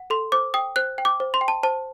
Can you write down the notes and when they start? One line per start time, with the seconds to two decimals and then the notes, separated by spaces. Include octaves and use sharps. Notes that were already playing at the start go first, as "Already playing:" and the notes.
Already playing: F#5
0.10 A4 C6
0.32 C5 D6
0.54 G5 D#6
0.76 C5 F#6
0.98 G5
1.05 D6
1.20 C5
1.34 C6
1.41 G5
1.48 A5
1.63 C5 A5